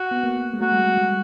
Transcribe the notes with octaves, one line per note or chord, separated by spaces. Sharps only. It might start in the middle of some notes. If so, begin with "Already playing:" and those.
Already playing: F#4
B3
A#3
G#3
A3 F#4
G3
G#3
G3